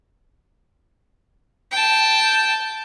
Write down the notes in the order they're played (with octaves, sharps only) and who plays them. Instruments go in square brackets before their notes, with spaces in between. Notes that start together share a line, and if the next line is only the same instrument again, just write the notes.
[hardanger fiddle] G5 A5